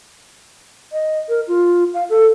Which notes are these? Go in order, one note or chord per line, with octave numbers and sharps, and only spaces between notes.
D#5
A#4
F4
F5
A4